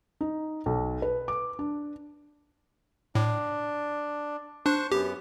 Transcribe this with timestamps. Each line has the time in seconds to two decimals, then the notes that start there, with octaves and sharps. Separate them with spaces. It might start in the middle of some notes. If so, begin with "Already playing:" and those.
0.21 D#4
0.66 B1
1.02 B4
1.28 D6
1.59 D4
3.15 A2 D4
4.66 D4 C5 C#6 F#6
4.92 F#2 B3 G4